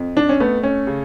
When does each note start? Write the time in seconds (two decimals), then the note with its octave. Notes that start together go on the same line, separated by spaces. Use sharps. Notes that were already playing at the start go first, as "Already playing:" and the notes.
Already playing: F2
0.17 D4
0.29 C#4
0.40 A3 B3
0.63 C#4
0.87 C#3